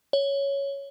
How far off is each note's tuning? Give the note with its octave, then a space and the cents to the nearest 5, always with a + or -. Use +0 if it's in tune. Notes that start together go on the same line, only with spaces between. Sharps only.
C#5 +5